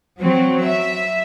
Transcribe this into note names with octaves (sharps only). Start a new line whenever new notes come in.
F#3 C4
E5